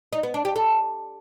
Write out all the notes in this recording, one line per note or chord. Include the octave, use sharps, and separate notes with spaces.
D#4
B3
D4
G4
A4